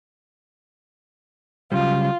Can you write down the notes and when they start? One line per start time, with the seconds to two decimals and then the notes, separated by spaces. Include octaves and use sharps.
1.72 C#3 F#3 G3 F4